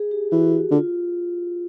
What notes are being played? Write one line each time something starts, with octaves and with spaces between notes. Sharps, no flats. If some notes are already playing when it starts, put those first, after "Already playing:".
Already playing: G#4
G4
E3 F#4
D3 F4